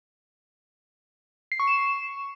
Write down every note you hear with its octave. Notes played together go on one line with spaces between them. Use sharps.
C7
C#6
E7